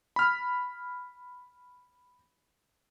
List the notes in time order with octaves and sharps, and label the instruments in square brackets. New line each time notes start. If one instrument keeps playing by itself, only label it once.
[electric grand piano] B5 F6